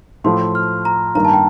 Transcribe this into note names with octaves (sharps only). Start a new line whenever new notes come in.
A2 F3 A3 C6
F6
A#5
G2 D#3 A#3 A#5
A5
G5